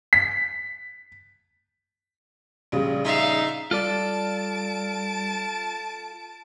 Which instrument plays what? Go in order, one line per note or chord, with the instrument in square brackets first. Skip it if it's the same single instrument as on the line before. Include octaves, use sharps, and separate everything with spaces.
[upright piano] B6
[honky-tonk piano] A#1 C#3 G3
[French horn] D#4 [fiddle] E5 F5
[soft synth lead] G3 [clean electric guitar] F4 A4 D5 [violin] A5 D7